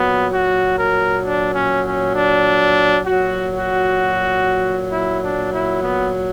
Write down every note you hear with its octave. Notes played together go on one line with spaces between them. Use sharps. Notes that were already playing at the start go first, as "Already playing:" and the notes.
Already playing: A#2 F#3 B3
F#4
A#4
D4
C#4
C#4
D4
A#2 F#3 F#4
F#4
E4
D4
E4
B3